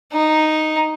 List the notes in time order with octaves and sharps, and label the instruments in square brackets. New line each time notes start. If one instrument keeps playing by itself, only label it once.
[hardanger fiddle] D#4